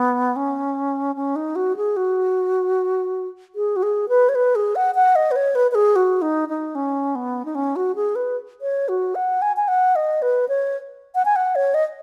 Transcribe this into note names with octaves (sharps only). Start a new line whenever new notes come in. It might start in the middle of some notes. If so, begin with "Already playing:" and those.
Already playing: B3
C#4
C#4
D#4
F#4
G#4
F#4
G#4
F#4
G#4
B4
C#5
B4
G#4
F#5
F#5
D#5
B4
C#5
B4
B4
G#4
F#4
D#4
D#4
C#4
B3
D#4
C#4
F#4
G#4
B4
C#5
F#4
F#5
G#5
G#5
F#5
D#5
B4
C#5
F#5
G#5
F#5
C#5
D#5